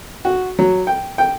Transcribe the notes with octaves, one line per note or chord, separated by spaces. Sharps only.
F#4
F#3
G5
G5